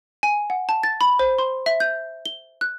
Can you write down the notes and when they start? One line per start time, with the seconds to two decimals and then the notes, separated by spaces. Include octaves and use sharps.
0.23 G#5
0.50 F#5
0.69 A5
0.83 A6
1.01 B5
1.19 C5
1.39 C6
1.66 E5
1.80 G6
2.26 G7
2.61 F#6